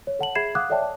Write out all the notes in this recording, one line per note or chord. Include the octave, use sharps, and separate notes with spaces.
C#5
A4 F#5 A5 F#7
G#4 E5 B5 G#6 C7 E7
F5 F#5 D6 D#6 F#6
A4 C#5 D5 E5 G5 A5
A5